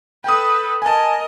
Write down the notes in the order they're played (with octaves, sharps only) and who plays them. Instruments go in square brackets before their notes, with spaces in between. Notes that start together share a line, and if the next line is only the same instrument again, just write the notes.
[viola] A4 B4 [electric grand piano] G5 D#6
[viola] A#4 D#5 [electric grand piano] G#5 A5